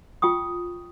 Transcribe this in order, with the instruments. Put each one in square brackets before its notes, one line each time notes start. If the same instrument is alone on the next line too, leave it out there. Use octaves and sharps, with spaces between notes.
[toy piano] F4 G5 C#6 D#6